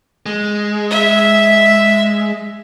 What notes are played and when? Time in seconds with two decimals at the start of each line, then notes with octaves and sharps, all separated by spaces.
0.26 G#3
0.90 E5